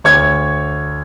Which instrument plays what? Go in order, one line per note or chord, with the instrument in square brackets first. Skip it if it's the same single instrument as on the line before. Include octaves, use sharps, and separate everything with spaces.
[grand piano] D2 C#5 C#6 G#6